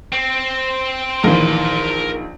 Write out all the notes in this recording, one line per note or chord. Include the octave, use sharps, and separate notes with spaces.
C4
A#1 D#3 E3 A#4 C6